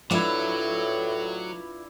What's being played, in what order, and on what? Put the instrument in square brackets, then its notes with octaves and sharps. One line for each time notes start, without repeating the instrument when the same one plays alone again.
[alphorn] A2 [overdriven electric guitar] F#3 [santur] D4 E4 [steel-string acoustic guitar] F4 B4 E5